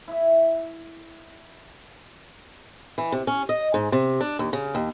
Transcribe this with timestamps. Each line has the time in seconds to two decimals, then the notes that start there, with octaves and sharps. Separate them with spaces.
0.08 E4 E5
2.98 E3
3.12 C3
3.27 C#4
3.49 D#5
3.74 G#2
3.92 C3
4.21 D4
4.39 D#2
4.53 C#3
4.75 D#2